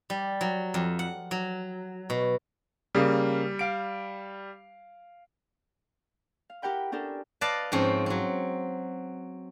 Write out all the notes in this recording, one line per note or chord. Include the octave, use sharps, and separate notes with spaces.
G3
F#3
F2
F#5
F#3
B2
C#3 G3 A#3
F5 D7
F5
E4 G4 A#4 F#5 G5 B5
C#4 D4 G4 A4 A#4
B4 D5 D#5 F5 A5
G#2 F3 C4 C#4
F#3 C4